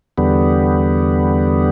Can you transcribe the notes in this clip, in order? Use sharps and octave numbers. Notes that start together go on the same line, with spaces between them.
E2 D3 G3 B3